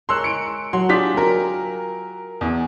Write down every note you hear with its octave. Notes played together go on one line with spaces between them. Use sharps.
G#3 A#4 C#5 C6 E6 F#6
C#7 D7
F#3 C6
D4 F4 G4 G#4 B6
F#3 A#4
E2